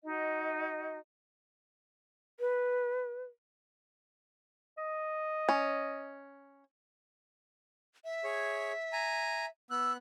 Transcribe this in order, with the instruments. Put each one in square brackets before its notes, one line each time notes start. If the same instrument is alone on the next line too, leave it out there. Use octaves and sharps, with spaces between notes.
[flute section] D#4 F#4 D#5
[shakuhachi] B4
[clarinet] D#5
[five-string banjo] C#4
[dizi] E5
[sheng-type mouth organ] G#4 C#5
G#5 A#5
[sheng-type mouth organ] B3 F#6 [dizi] E6